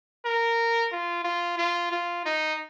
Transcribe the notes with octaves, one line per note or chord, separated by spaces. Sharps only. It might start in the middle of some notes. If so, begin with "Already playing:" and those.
A#4
F4
F4
F4
F4
D#4